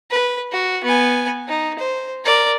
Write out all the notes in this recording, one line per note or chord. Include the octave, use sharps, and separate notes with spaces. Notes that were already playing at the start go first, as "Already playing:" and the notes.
B4
F#4
B3 G#5
D#4
C5
A#4 D5